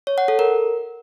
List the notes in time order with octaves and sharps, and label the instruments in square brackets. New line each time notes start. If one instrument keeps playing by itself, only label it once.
[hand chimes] C#5
F#5
A4
A#4